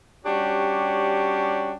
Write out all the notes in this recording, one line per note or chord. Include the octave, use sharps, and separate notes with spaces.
G3 C#4 D4 F#4 G4 C#5